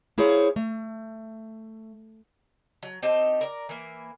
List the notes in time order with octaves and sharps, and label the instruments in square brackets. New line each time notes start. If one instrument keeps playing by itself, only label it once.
[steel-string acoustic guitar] A#3 E4 G#4 C5 C#5 F5
A3
[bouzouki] F#3
C4 D#4 G4 A5
A#4 D5
E3 A#3